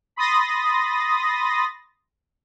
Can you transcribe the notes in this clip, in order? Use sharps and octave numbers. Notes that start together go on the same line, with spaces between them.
B5 C6 D#6 A6 A#6